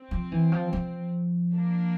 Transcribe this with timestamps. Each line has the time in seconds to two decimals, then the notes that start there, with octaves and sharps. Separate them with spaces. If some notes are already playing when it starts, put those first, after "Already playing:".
Already playing: C4
0.11 F3
0.32 E3
0.52 F3
0.73 F3
1.54 A#3 D4